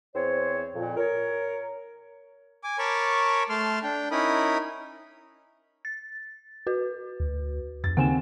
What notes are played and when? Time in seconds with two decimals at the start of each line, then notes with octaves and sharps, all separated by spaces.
0.14 E2 C4 C5 C#5
0.75 F2 A#2
0.97 A#4 C#5
2.64 G#5 D6
2.79 A#4 C#5 A5 B5 C#6 D6
3.49 A3 A5 C6 F6
3.83 D4 G5
4.11 C#4 D#4 E4 A#4 B5 D#6
5.85 A6
6.67 F#4 B4
7.20 D2
7.84 F2 A6
7.97 D#2 C#3 C4 F#5 G#5 E7